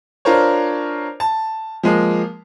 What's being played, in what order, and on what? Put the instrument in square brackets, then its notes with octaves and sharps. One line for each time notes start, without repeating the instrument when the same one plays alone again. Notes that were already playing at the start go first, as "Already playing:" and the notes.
[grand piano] D4 F4 A#4 C5 C#5
A5
F3 G#3 A#3